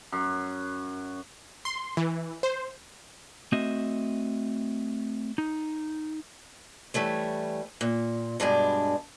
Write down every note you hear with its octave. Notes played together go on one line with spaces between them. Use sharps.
F#2
C6
E3
C5
A3 C4 F#4 D#5 E5
D#4
E3 G3 A3 C#5
A#2
G2 B2 G#3 D4